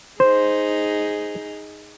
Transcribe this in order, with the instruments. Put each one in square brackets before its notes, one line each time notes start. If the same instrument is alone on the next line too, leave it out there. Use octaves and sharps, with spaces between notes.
[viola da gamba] D#4 G#4 [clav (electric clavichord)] C5